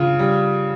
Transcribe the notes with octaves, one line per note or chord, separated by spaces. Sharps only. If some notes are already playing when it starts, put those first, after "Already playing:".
Already playing: C#3 F4
G3